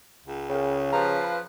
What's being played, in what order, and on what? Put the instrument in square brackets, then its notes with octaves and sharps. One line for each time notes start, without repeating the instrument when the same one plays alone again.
[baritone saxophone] C#2
[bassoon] C#3 [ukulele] A#4 C5 G5
[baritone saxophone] F3 [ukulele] F4 G4 A#5 [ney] B4
[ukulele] F5 B5